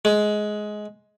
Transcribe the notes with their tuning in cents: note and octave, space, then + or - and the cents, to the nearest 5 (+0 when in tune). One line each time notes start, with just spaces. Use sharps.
G#3 +15